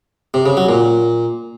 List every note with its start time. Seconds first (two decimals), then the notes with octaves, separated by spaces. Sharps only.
0.34 C3
0.46 C#3
0.57 F#3
0.69 A#2